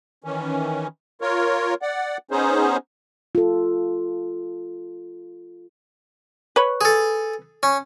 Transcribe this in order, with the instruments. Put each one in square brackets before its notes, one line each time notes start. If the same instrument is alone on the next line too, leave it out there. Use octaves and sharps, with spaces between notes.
[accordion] D#3 E3 C#4
F4 A#4 C#5
D5 F#5
B3 C#4 D#4 G#4 C5
[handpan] F4 A4
[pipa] B4 C#5
[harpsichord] G#4 A4
C#4